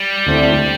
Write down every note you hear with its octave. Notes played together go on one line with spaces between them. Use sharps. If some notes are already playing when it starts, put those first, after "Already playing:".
Already playing: G3
D2 D3 A3 C4 E4